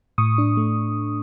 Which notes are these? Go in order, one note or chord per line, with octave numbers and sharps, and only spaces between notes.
A2 C#6 D#6
D4
A3